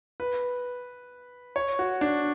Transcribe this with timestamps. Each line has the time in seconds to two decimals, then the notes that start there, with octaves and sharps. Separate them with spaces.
0.20 B4
1.56 C#5
1.79 F#4
2.01 D4